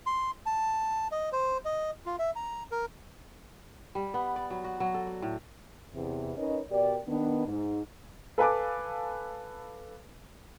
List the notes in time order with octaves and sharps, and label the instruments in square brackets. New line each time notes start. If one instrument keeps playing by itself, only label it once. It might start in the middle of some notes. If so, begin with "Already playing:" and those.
[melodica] C6
A5
D#5
C5
D#5
F4
E5
A#5
A#4
[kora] G3
B3
D5
F#3
F#4
F#3
A4
D5
A2
[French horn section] E2 C3
C#4 D#4 A#4 B4 C#5 D#5
B2 G4 A#4 D5
D#3 B3 D4
G#2 D#4
[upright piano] A4 B4 F5 G#5 A5 D6